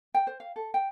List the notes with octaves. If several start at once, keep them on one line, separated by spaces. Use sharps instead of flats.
G5
C5
F5
A4
G5